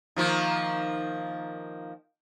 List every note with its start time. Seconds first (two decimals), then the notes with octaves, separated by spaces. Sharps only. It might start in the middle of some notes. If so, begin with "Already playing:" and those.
0.16 D#3 F3 A#3